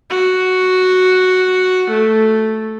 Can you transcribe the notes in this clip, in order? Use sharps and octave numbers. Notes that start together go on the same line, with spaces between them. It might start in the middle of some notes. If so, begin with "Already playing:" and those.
F#4
A3